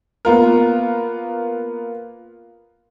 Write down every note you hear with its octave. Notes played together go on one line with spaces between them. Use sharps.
A#3 B3 F4 A#4